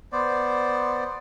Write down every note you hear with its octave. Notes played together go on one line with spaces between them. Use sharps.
B3 C5 D5